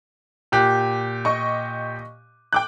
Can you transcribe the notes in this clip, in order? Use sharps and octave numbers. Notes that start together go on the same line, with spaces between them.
A#2 G4 F#6
D#5 C#6
G5 D6 F#6